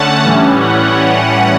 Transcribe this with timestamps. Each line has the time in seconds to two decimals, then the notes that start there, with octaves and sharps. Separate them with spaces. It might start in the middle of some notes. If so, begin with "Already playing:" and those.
Already playing: D3 A3 C#4 F#5 A5
0.25 A2 E3 G3 C#4
0.60 F#5